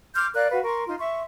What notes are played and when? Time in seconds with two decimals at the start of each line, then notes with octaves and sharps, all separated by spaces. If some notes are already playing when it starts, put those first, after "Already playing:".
0.15 C6 D6 F6 G6
0.34 A#4 D5 F5 F#6
0.50 F#4 B4 F5
0.64 A#4 C6 C#6
0.87 D#4 F4 C6
0.99 E5 C6 C#6